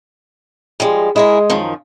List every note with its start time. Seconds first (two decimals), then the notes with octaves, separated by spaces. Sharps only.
0.80 F3 G3 G#3
1.16 G#3 E4 G#4 A#4
1.50 F#2 D#3 F3